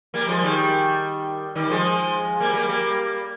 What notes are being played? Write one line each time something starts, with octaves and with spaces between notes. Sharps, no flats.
G3 A#3
F3 G#3
D#3 G3
D#3 G3
F3 G#3
G3 A#3
G3 A#3
G3 A#3